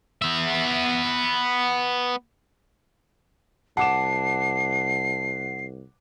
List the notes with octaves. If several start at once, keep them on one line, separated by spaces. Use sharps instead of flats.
B3 E5
C2 F#5 A5 D6 C7 E7